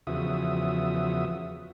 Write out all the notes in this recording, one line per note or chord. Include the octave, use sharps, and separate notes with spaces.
E2 C#3 F3 F#4 E5 D#6